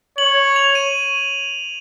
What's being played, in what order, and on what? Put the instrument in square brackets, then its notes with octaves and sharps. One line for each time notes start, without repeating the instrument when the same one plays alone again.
[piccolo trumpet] C#5 [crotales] F#7
[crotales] F7
D#7